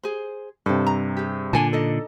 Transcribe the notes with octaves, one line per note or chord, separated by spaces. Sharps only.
G#4 C5
G2 C3 A4 C5
A#5
G4 G#4
A#2 D3 D4 G#5 A5
D4 D#4 A4 D#5